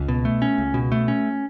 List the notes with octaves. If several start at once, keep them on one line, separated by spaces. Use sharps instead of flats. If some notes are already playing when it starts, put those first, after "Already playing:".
Already playing: C#2
B2
A3
C#4
C#2
B2
A3
C#4